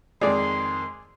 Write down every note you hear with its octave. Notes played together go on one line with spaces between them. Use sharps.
F2 D#3 G#3 G#4 D5 C6